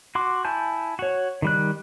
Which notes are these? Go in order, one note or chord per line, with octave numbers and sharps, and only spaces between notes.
F#4 C6 D6
E4 G#5 A5 G6
F#4 C#5
D#3 G3 F#6